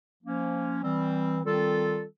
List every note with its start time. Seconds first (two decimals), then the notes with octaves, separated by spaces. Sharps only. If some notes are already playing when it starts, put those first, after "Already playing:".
0.23 F3 A#3 C#4
0.83 E3 G3 C4
1.43 D#3 G3 C4 F4 A4